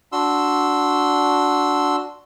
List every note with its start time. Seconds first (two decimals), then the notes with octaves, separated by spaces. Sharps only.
0.12 D4 F#4 C6 E6